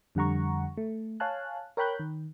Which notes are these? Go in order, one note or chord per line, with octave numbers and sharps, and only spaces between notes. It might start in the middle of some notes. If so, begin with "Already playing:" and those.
F2 D3 G3 F#5 A#5 C#6
A3
C#5 F5 G#5 A5 F#6
A#4 C#5 G5 B5 F#6 G6
D#3